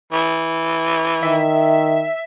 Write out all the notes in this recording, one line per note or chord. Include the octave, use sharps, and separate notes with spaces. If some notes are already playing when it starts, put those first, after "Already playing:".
E3
D#3 E5